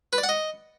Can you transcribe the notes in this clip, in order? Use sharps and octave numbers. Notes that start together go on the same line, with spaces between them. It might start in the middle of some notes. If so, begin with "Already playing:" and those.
B4
D5
F#5
D#5